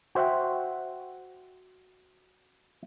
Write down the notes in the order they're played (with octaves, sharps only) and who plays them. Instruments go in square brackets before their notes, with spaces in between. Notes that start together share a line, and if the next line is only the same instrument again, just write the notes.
[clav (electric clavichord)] F#4 C5 E5 F#5 G5